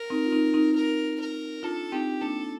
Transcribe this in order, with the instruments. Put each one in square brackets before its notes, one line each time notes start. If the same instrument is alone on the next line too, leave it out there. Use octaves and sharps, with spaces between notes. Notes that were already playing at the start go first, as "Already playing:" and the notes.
Already playing: [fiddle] A#4
[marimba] C4 D#4
F4
C4 D#4
C4 D#4
[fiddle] A#4
A#4
[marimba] D4 F4 [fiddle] A4
[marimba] C4 D#4 [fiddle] G4
[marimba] A#3 D4 [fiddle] A4